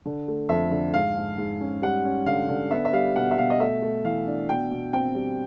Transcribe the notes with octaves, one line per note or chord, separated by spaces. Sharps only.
D3
A3
F2 E5
D3
G#2 F5
G#2
G#2
C#4
G3 F#5
C#4
D3 F5
D3
B3 E5
E5
G3 F5
B2 F#5
E5
B2 F5
D#5
A3 E5
A3
E3 F5
D4
B2 G5
B2
C4 G5
G3